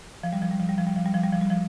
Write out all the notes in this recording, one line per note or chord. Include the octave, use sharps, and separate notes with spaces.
F3
G3
F3
G3
F3
G3
F3
G3
F3
G3
F3
G3
F3
G3
F3